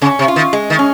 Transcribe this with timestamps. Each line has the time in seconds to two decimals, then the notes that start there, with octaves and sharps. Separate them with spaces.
0.02 C#3 C#4
0.19 C3
0.28 F4
0.36 D#3
0.53 G#3
0.70 D#3
0.79 C#4